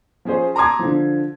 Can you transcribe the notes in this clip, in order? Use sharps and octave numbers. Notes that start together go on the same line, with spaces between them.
F3 C#4 G#4 C5
A5 A#5 C6 D6 D#6 G#6
D3 F3